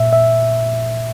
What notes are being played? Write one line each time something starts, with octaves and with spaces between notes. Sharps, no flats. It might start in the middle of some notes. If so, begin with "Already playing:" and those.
Already playing: A#2 E5
E5